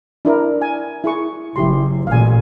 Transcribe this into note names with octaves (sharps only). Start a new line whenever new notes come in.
D4 E4 A#4
G#5
E4 G#4 C#6
F#1 E4 G4 C6
A1 A#2 F5 G#5